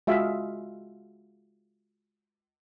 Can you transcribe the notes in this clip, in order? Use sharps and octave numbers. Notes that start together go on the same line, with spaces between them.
G#3 F4 F#4 G#4 E5 F5